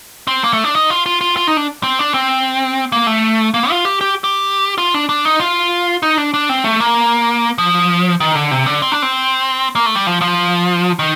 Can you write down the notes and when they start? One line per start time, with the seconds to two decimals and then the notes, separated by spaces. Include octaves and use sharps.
0.27 C4
0.44 A#3
0.53 A3
0.64 D4
0.75 D#4
0.90 F4
1.06 F4
1.21 F4
1.37 F4
1.47 D#4
1.57 D4
1.83 C4
1.99 D4
2.14 C4
2.92 A#3
3.07 A3
3.54 A#3
3.70 F4
3.85 G4
4.01 G4
4.24 G4
4.78 F4
4.94 D4
5.09 D4
5.25 D#4
5.40 F4
6.03 D#4
6.17 D4
6.34 D4
6.49 C4
6.64 A3
6.80 A#3
7.58 F3
8.20 D#3
8.35 D3
8.51 C3
8.66 D3
8.82 C4
8.92 D4
9.02 C4
9.75 A#3
9.86 A3
9.95 G3
10.07 F3
10.22 F3
10.99 D#3